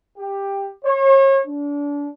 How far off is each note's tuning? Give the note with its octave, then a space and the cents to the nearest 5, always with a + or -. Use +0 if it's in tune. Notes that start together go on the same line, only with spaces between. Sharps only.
G4 +10
C#5 -35
D4 -30